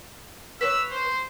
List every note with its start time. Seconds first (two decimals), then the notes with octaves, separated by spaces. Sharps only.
0.61 B4 C#5 E6
0.91 C5